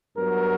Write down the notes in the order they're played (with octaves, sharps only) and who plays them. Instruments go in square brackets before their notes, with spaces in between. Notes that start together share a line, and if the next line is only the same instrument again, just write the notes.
[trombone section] G2 F#3 B3 A#4